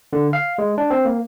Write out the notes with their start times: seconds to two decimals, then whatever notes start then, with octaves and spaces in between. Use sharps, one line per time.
0.13 D3
0.33 F5
0.58 G#3
0.78 D4
0.90 C4
1.05 A#3